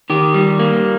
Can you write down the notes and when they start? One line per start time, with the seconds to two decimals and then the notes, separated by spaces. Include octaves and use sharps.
0.10 D#3 G4
0.34 G3
0.59 A#3